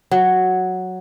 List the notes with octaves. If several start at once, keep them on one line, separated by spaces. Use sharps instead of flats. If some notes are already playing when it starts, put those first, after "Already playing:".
F#3